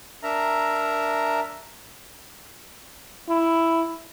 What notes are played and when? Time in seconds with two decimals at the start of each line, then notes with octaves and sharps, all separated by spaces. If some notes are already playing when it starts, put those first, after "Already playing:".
0.23 D4 A#4 E5 A#5
3.29 E4